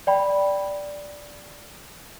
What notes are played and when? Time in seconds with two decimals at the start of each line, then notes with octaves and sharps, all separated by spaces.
0.07 D5 G5 B5